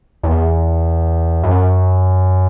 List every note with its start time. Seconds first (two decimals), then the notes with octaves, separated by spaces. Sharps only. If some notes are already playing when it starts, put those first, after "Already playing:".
0.23 E2
1.43 F#2